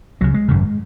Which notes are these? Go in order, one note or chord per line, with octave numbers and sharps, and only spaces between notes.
C#2 C#3 F#3
G#3
G#1 F#2 C#3